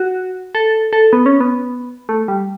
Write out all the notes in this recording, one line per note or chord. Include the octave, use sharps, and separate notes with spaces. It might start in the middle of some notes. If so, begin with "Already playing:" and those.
Already playing: F#4
A4
A4
B3
C#4
B3
A3
G3